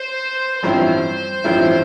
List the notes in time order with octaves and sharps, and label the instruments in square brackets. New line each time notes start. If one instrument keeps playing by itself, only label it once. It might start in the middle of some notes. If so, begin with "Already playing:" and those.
Already playing: [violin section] C5
[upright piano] A1 G2 F3 C4 E4 [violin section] C5
[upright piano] A1 G2 F3 C4 E4